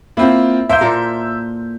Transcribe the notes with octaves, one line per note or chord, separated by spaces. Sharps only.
A#3 C4 E4 F4
A#3 C5 E5 G6
A#2 A4 A#4